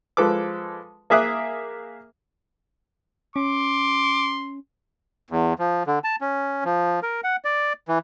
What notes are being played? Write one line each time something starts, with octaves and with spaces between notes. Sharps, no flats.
F3 G#3 A4 B4 D6
A#3 G#4 E5 D6 D#6 F#6
C#4 C6 D6
E2
F3
D3
A5
C#4
F3
A#4
F#5
D5
E3